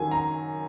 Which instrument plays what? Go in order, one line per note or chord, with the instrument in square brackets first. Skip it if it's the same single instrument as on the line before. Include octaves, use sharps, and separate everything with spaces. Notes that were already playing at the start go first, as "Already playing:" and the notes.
Already playing: [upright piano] F#2 D#3 F#3 G#5
A#5